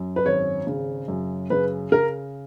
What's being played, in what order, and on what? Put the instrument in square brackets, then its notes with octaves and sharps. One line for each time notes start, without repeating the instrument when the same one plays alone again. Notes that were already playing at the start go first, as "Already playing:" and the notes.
Already playing: [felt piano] F#2
[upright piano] B4
[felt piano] G#1 [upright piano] C#5
[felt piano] C#3
F#2
[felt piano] C#3 [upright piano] B4
[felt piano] C#3 [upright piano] A#4